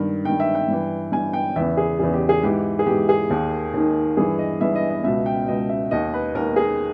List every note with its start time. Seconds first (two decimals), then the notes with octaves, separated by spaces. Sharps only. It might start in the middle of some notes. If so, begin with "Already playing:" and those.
Already playing: G2 D#3
0.25 G2 D#3 G5
0.40 E5
0.55 G5
0.68 G2 E3
1.12 G2 E3 G#5
1.33 G5
1.56 E2 C#3 E3 E5
1.77 G#4
1.99 E2 C#3 E3 G#4
2.14 G4
2.29 G#4
2.43 G#2 E3 G4
2.79 G#4
2.86 G#2 E3 G4
3.09 G#4
3.30 D#2 D#3
3.74 D#2 D#3
4.17 G2 E3 G#4
4.39 D#5
4.61 G2 E3 E5
4.75 D#5
4.90 D#5
5.04 C#2 B2 E5
5.26 G5
5.47 C#2 B2 D#5
5.69 E5
5.91 D#2 D#3 D#5
6.14 B4
6.34 D#2 D#3 A#4
6.56 G#4